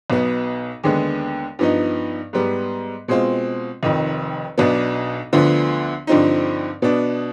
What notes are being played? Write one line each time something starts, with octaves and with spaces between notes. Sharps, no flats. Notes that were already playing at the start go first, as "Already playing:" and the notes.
B1 B2 B3
D#2 D3 G#3 B3
G2 F3 B3 D#4
G#2 G3 B3
B2 G#3 C4 F4
F1 F2 D#3
B1 B2 B3 D4
D2 D3 F3 B3
G2 D3 F3 C4 D#4
B2 B3 D4